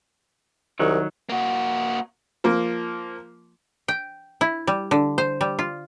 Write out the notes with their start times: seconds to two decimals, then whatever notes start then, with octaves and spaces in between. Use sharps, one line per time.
0.79 C2 D#3 F#3
1.29 A#3 F#4
2.44 F3 A#3
3.88 G5
4.41 E4
4.67 G3
4.91 D3
5.18 C5
5.41 G3
5.59 F4